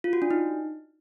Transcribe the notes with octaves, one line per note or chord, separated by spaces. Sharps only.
F4
F#4
D4
D#4